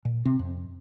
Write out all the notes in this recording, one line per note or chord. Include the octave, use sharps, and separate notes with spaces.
A#2
C3 C4
F2